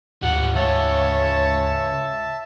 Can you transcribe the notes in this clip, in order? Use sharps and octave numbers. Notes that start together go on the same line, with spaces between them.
D2 G#2 G3 F4 F#5
C#2 F4 C#5 E5 A5